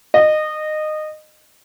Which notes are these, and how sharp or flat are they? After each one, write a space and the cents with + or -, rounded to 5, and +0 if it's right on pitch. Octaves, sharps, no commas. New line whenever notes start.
D#5 -20